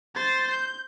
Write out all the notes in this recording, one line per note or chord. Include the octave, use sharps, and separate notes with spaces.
C5 A6
G6